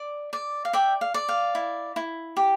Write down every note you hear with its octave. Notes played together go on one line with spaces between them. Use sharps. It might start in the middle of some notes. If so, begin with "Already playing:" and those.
Already playing: D5
D5
F5
D5 E5 G5
F5
D5
F5
E4
E4
G4